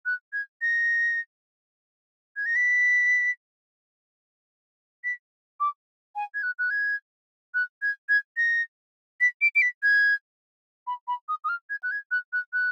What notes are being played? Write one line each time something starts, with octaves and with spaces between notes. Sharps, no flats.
F#6
G#6
A#6
G#6
A#6
B6
B6
D6
G#5
G#6
F#6
F#6
G#6
F#6
G#6
G#6
A#6
B6
D7
D7
B6
G#6
B5
B5
D#6
D#6
F6
G#6
F#6
G#6
F#6
F#6
F#6